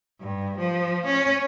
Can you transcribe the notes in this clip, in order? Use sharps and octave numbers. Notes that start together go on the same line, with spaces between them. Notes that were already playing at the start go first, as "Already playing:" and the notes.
G2
F3
C#4